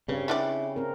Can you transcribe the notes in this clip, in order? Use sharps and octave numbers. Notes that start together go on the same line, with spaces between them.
G2 C#3 C4
G3 D4 E4 D5
C4 A#4